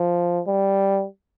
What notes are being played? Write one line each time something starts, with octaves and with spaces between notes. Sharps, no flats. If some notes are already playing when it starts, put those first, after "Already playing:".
Already playing: F3
G3